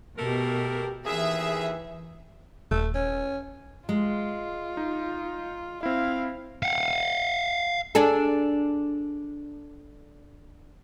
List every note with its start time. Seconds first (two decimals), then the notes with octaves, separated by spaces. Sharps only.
0.18 B2 A3 G4 A#4
1.07 D#2 E3 G#4 E5
2.71 D#1 A3
2.95 C#4
3.89 G#3 F4
4.77 D#4
5.83 C4 E4 F5
6.63 F5 F#5
7.95 D4 G#4 A4